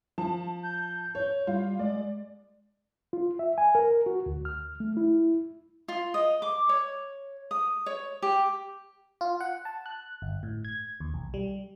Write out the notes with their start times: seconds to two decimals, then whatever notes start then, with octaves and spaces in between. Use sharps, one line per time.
0.18 F3 A5
0.63 G6
1.15 C#5
1.47 G3 F4
1.79 G#3 D5
3.13 F4
3.39 E5
3.58 G#5
3.75 A#4
4.06 F#4
4.26 D2
4.45 F6
4.80 A3
4.97 E4
5.88 F4
6.14 D#5
6.42 D6
6.69 C#5
7.51 D#6
7.86 C#5
8.22 G4
9.21 F4
9.41 F#5
9.65 A5
9.86 F#6
10.22 G1
10.43 A2
10.65 G#6
11.00 D#2
11.14 B1
11.34 G3